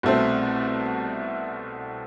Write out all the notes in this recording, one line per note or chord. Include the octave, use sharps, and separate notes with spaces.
C2 B2 A3 C4